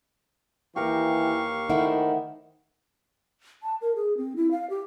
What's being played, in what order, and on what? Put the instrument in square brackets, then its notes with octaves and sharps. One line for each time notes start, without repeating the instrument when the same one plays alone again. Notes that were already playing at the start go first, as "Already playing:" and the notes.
[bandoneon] D#2 F5 C#6 [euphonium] E3 [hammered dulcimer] G4 A#4
[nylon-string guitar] D#3 A3 E4 [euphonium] D#4 [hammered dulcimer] C5 E5 F#5
[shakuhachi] A5
A#4
G#4
C4
E4
F5
G4